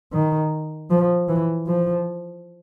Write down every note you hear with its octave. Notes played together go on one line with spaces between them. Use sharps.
D#3
F3
E3
F3